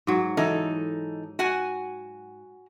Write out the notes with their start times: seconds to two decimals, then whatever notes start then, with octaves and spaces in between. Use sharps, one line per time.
0.07 G#2 F#3
0.37 E3 D#4 A4
1.39 F#4 F#5 G#5